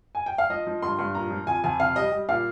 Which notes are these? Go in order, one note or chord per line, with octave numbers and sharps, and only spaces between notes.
G#5
G5
F5
F3 D#5
F3
G2 C6
G2
A#2 A#5
F3
F2 G#5
F2 G#5
C3 F5
G3 D#5
G3
A#2 F5